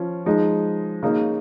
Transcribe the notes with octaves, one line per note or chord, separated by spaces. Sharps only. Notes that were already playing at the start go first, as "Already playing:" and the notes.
Already playing: F3 C#4
F3 G#3 D#4
C#3 A#3 D#4